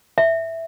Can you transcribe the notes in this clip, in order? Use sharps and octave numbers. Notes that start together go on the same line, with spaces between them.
E5